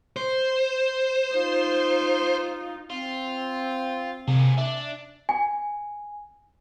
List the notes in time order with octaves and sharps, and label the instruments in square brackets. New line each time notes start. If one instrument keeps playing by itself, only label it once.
[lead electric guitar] C5
[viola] D#4 F4
[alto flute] C4 [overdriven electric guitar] F4
[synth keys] C3 [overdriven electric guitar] A#3 G#4
[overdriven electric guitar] D4 [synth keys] E5
[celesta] G#5